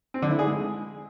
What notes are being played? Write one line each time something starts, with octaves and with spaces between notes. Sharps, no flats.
C4
D3
E4
G#4
G#3